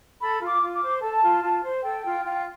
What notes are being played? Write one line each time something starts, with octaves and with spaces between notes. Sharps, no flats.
A4 B5
F4
D6
F4
D6
C5
A4 A5
F4
F4
C5
A4 G5
F4
F4